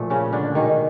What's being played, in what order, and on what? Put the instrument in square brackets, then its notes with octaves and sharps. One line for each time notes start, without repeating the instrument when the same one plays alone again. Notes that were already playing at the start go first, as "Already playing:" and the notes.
Already playing: [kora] A#2 F3 A3
C#3 C#4
D3 D4
B2 D#3 G#3 D#4